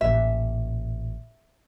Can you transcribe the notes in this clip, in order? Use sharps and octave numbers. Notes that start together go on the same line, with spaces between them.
A1 A#2 E5